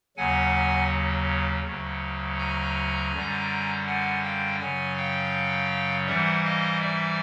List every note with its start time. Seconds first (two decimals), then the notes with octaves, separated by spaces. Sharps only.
0.17 D#2 C#3 F#3 F#5 G#5
1.65 D2 C#3 F#3
2.38 G#5 A#5
3.12 F#2 D3 G3
3.86 F#5 G#5
4.23 F5 G5
4.60 F#2 C#3 F#3 F#5 G#5
4.97 F5 G5
6.07 G#2 E3 G3 E5 F#5
6.45 D#5 F5
6.81 D5 E5